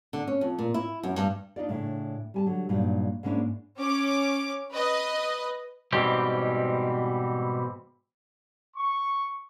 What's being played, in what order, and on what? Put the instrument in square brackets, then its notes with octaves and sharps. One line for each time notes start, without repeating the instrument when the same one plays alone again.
[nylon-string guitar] D3
C#4
F2
A#2
E4
F#2
G2
D4 D#4 F4 D5
A2 C#3 D4
G3 G#5 A5
D3 F#3
G2 A#2 F#3 D#4
G#2 G#3 A#3 C#4 D4 E4
[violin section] C#4 D6
B4 D#5
[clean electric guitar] G#2 B2 E3 G3 C4 G4
[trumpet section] C#6